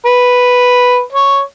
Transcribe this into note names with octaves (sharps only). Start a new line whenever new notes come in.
B4
C#5